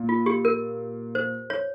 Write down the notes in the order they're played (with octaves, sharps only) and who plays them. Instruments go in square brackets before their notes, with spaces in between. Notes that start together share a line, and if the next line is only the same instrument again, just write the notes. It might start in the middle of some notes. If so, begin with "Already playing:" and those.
Already playing: [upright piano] A#2
[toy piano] F4
G4
A#4
C5
C#5